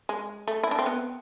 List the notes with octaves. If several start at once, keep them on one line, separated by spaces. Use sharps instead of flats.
G#3
A3
E4
D4
C4
B3